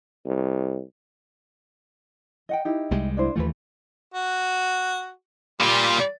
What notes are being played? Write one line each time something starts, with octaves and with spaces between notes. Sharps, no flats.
C2
D#5 F#5 G5
D#4 E4 G4
C2 G3 G#3
D4 E4 C5
D#2 E3 A3 F4 B4
F#4
A#2 G3 F4